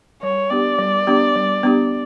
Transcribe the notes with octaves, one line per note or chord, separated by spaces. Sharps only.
G3 C#5
B3 D4 G4 D5
G3
B3 D4 G4
G3
B3 D4 G4